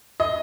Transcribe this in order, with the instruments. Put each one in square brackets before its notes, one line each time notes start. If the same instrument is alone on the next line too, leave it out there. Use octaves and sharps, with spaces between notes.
[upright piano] D#5